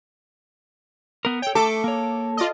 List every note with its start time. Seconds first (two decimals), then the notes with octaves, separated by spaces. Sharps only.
1.25 B3 A#4
1.42 A4 C#5 G5
1.55 A3 A4 D6
1.84 A#3 C#5
2.37 F4 D5 D#5